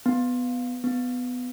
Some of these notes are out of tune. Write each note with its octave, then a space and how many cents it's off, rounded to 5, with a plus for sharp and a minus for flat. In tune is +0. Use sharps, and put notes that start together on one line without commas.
B3 +10
B3 +15